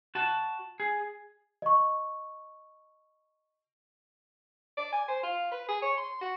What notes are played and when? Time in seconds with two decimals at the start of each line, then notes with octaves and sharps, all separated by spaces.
0.15 F#4 A5
0.80 G#4
1.62 D#5 C#6
4.77 D5
4.93 G#5
5.08 C5
5.23 F4
5.52 B4
5.69 G#4
5.82 C#5
5.98 C6
6.21 F#4